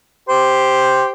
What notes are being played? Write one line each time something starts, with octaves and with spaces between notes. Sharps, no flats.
G4 C5